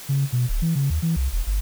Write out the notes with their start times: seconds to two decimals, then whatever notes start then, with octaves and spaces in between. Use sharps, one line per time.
0.09 C#3
0.32 B2
0.49 D1
0.62 E3
0.75 C#3
0.90 D#2
1.02 E3
1.16 C2
1.33 E1
1.47 G1